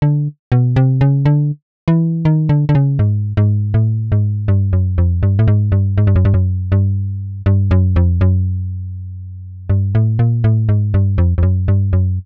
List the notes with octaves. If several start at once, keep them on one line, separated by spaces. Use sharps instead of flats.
D3
B2
C3
C#3
D3
E3
D#3
D3
D3
C#3
G#2
G#2
A2
G#2
G2
F#2
F2
G2
A2
G#2
G2
G#2
G2
F#2
G2
F#2
G2
G2
F#2
F2
F#2
G2
A2
A#2
A2
G#2
G2
F2
F2
F#2
G2
F#2